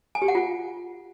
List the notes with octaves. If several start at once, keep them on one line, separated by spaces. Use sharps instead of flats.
G#5
G4
F#5
F4